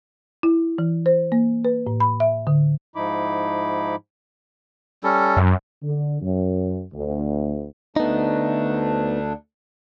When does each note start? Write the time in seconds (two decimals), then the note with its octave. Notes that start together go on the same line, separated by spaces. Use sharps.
0.43 E4
0.78 E3
1.06 C5
1.32 A#3
1.65 B4
1.87 A2
2.00 B5
2.20 E5
2.47 D3
2.96 G#2 F3 D#4 E4 B5 D6
5.04 G3 C#4 A4
5.37 F#2
5.83 D3
6.22 F#2
6.93 D2
7.96 D2 A3 B3 D4 D#4